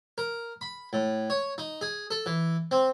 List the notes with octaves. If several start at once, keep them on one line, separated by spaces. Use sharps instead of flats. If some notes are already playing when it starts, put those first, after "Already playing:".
A#4
B5
A2
C#5
D#4
G#4
A4
E3
C4